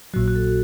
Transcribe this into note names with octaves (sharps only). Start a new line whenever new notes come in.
A#1 A#2 F#3 F#4
F#4
A4